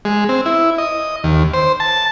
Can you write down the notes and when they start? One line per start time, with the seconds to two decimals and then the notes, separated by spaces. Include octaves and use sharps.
0.05 G#3
0.29 C4
0.46 E4
0.78 D#5
1.24 D#2
1.54 C5
1.80 A5